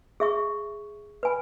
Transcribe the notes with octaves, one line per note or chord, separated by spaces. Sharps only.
G#4 E5 C#6
B4 G#5 B5